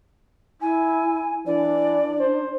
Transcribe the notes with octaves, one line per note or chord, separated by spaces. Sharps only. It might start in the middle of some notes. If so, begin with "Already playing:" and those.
E4 G#5
E3 D4 D5
C5